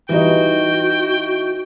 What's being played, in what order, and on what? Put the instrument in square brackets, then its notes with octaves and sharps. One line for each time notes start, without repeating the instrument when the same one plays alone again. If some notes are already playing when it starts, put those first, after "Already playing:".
[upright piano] E3 G3 D#4 [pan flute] F#4 [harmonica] G5